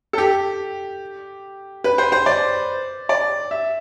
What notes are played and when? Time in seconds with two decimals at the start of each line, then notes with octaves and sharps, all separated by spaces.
0.13 A4
0.18 G4
1.84 B4
1.98 C5
2.12 C5
2.26 D5
3.09 D5
3.51 E5